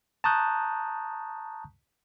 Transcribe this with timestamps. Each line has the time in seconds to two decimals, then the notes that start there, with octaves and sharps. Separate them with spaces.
0.24 A5 A#5 C#6 D#6 F#6 G6